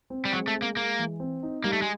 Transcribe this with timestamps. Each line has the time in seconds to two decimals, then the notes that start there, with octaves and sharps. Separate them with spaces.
0.10 C4
0.25 G3
0.33 F#3 G#3
0.48 A3
0.55 G#3
0.62 A#3
0.76 G#3 A#3
0.99 E3
1.20 C4
1.43 D#4
1.64 G3 A#3
1.73 A3
1.82 G#3